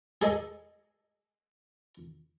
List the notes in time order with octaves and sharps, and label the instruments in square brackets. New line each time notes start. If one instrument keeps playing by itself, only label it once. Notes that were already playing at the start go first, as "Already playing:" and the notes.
[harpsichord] G#4 A4 D#5